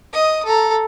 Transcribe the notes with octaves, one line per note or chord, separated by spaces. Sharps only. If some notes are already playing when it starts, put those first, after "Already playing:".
D#5 D#6
A4 A#5